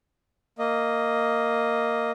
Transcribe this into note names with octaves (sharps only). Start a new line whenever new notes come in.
A#3 D#5